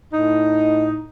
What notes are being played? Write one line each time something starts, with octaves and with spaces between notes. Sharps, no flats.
A2 D#4